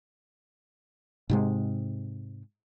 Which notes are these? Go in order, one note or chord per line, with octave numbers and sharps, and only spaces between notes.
G#2 C3 G#3